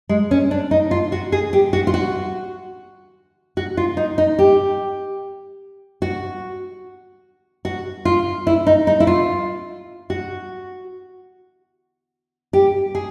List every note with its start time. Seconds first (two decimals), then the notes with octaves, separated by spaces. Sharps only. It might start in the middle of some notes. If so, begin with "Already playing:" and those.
0.09 G#3
0.31 C#4
0.51 D4
0.71 D#4
0.91 F4
1.12 F#4
1.32 G#4
1.53 G4
1.73 F#4
1.87 F4
1.94 F#4
3.57 F#4
3.77 F4
3.97 D#4
4.18 D#4
4.39 G4
6.02 F#4
7.65 F#4
8.05 F4
8.47 E4
8.67 D#4
8.87 D#4
9.00 E4
9.07 F4
10.10 F#4
12.53 G4
12.95 G#4